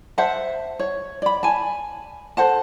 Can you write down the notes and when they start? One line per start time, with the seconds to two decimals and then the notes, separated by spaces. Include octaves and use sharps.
0.18 C5 E5 F#5 A5
0.79 C#5
1.22 D5 B5
1.43 G#5 A5
2.37 A4 C5 F#5 A5